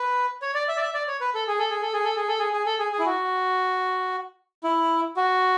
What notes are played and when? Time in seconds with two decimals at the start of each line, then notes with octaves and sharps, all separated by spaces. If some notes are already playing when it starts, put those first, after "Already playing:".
Already playing: B4
0.42 C#5
0.54 D5
0.68 E5
0.77 D5
0.81 E5
0.94 D5
1.08 C#5
1.21 B4
1.34 A4
1.47 G#4
1.59 A4
1.70 G#4
1.81 A4
1.93 G#4
2.04 A4
2.16 G#4
2.28 A4
2.39 G#4
2.53 G#4
2.66 A4
2.79 G#4
2.92 G#4
2.99 E4
3.06 F#4
4.64 E4
5.17 F#4